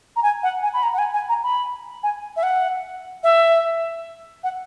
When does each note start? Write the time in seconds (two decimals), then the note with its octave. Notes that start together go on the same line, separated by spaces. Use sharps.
0.16 A#5
0.23 G#5
0.43 F#5
0.63 G#5
0.73 B5
0.83 A#5
0.93 F#5
0.98 G#5
1.13 G#5
1.29 A#5
1.43 B5
2.03 G#5
2.36 E5
2.43 F#5
3.23 E5
4.44 F#5